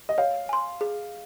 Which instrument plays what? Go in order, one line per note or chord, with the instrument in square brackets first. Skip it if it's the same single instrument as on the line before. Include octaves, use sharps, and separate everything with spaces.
[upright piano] D#5
[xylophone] C#5 [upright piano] F5
[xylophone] G#5 C6
G#4